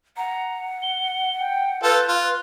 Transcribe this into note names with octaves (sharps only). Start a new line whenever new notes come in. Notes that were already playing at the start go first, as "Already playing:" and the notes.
F#5 A#5
G7
G5
F4 A4 B4 G6
F4 F#6